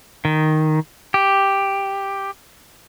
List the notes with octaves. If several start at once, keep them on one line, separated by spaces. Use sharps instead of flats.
D#3
G4